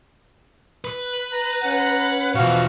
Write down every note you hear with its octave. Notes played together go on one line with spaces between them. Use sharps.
B4
A#5
C#4 F#5
B2 E3 F3 B3 F#4 F5 C#6